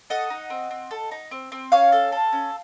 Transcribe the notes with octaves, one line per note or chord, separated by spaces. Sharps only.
A4 D#5 F#5
D#4
C4
C4
A4
D#4
C4
C4
C#4 C#5 F5
A4
A4
C#4